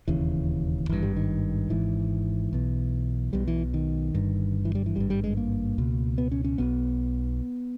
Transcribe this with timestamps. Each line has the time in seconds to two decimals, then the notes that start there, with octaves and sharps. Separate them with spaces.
0.08 E1 D#2 C#3 E3
0.89 G#1 G2 E3
1.03 G3
1.16 D#3
1.70 G#1 G#2 E3
2.53 B1 B2
3.33 B1 B2 G3
3.48 E3
3.74 D#3
4.15 G1 G2
4.65 E3
4.75 G3
4.86 E3
4.96 G#1 G2 G3
5.10 G3
5.24 G#3
5.37 A#3
5.78 C#2 B2
6.18 B3
6.32 C#4
6.44 C#4
6.58 B1 B2 B3